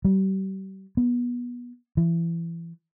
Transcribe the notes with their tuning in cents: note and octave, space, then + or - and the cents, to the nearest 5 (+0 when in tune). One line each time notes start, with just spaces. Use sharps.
G3 -35
B3 -25
E3 +25